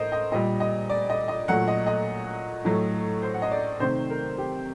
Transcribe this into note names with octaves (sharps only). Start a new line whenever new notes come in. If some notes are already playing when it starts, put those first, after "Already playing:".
Already playing: A2 A#4 C5 D#5
D#5
A#2 G3 D#5
D#5
D5
D#5
D#5
A#2 F#3 A3 F#5
D#5
D#5
A2 F#3 A3
C5
F#5
D#5
D5
C3 D#3 A3 C5
A#4
G4